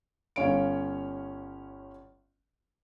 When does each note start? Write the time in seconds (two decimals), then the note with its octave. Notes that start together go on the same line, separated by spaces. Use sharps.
0.36 G1 C#4 C#5 F5 D7